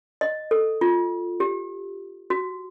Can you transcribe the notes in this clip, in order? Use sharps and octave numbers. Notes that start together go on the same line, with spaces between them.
D#5
A4
F4
G4
F#4